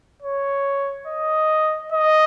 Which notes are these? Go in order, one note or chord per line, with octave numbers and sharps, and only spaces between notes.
C#5
D#5
D#5